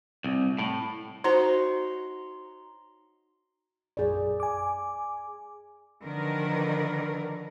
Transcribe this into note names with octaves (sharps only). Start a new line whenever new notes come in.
C2
A2
D#4 F#4 C5 C#5 A#5 C6
A#1 F#2 G#4 D5
G#5 D6
D3 D#3 F3 A#4 B4